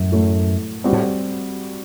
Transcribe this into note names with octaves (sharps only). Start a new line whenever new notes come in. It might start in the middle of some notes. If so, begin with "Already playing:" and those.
Already playing: F#2 A2
A2 F#3 A3
G3 C4 F#4
A2